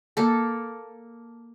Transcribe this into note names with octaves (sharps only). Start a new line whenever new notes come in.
A#3 A4